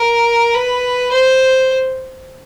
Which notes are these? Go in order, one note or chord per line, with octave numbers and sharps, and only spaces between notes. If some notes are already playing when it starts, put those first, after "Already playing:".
Already playing: A#4
B4
C5